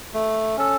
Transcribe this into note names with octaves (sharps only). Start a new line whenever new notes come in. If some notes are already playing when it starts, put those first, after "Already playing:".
A3
C#4 A4